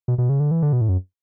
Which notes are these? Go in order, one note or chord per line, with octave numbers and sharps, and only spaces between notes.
B2
B2
C#3
D3
E3
D3
B2
A2
F#2